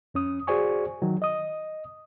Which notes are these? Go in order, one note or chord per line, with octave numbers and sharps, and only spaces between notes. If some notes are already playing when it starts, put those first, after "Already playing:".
F2 C#4 D#6
F#4 G#4 C5 D5 G#5 C#6
D#3 F#3
D#5 D#6